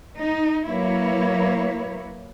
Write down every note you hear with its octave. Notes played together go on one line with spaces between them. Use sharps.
D#4
F#3 A#3 E4 B4 C#5